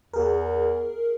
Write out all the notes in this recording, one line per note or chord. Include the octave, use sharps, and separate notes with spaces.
E2 G#4 A#4